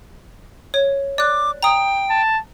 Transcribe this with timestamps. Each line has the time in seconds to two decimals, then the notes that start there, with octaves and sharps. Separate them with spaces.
0.74 C#5
1.18 D5 D6 F#6
1.63 G5 A#5 D#6
2.10 A5